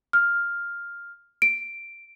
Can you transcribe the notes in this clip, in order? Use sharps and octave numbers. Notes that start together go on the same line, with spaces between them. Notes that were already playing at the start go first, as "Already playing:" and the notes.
F6
D7